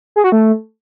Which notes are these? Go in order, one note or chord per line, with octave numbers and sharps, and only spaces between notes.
G#4
F#4
A3